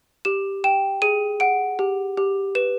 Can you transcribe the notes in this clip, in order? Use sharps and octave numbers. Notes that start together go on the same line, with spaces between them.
G4 E7
G5 E7
G#4 D#7
F#5 D7
G4
G4
B4 E7